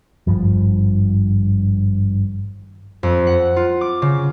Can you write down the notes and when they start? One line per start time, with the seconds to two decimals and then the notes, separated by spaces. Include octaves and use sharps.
0.27 G#1 C#2 G2 F3
3.03 F2
3.27 F#5
3.56 F4
3.81 D6
4.02 C#3